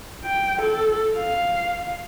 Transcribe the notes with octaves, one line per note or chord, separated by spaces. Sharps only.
G5
A4
F5